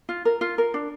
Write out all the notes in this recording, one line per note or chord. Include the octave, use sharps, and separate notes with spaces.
F4
A#4
F4
A#4
D4